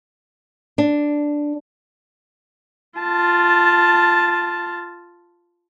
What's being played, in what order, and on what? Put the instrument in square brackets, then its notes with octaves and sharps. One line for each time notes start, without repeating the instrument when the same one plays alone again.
[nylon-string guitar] D4
[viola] F4 A5